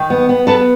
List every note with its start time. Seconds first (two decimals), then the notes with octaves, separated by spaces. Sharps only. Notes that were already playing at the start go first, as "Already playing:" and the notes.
Already playing: D#3
0.10 B3
0.29 B3
0.47 B3 A4 B4